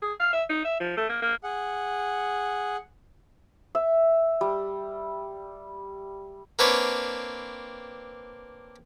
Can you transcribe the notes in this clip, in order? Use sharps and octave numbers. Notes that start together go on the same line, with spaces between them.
G#4
F5
E5
D#4
E5
F3
A3
A#3
A#3
G#4 F#5
E5
G3
A#3 C4 D4 B4 C#5